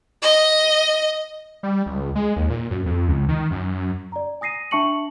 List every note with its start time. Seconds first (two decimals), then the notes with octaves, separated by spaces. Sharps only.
0.22 D#5
1.63 G3
1.86 C#2
2.15 G#3
2.36 D#2
2.50 A#2
2.71 F#2
2.86 F2
3.08 C#2
3.29 D#3
3.51 F#2
4.12 D5 A#5
4.41 G#5 D#6 A#6 C7 D#7
4.71 D4 E5 A5 C#6 C#7 F#7